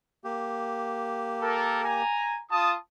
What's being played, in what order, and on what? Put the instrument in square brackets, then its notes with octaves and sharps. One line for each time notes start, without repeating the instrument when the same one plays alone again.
[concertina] A#3 G4
[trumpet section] A4 A#4
G#5 A#5
F4 A5 D#6